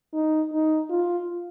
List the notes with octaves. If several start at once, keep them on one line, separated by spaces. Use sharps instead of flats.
D#4
D#4
F4